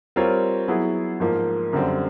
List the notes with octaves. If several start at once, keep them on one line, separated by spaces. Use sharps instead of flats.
G3 C4 F4 A#4 C#5
F#3 B3 E4 G#4
G#2 F3 A#3
F#2 D3 G3 C4